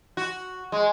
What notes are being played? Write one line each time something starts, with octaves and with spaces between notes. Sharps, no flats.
F#4
G#3